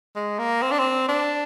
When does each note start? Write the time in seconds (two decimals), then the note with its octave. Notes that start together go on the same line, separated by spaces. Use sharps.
0.16 G#3
0.39 A#3
0.62 C4
0.71 D4
0.79 C4
1.08 D4